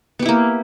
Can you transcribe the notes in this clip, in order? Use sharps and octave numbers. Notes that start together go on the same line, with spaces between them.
A#3 B3 E4 G4